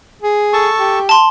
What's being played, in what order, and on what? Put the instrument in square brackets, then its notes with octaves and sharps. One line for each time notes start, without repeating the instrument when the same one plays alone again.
[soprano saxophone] G#4
[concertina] A4 A5 C#6
[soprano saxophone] G4
[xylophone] A5 C6